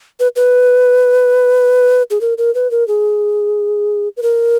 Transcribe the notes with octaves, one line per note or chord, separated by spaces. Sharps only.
B4
B4
G#4
A#4
A#4
B4
A#4
G#4
B4
A#4